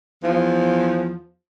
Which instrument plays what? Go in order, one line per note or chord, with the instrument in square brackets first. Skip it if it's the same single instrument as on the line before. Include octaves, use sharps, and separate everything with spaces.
[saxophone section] E2 F3